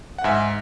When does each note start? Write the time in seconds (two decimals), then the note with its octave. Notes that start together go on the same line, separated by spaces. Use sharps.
0.18 F#5
0.24 G#2 E5 G#5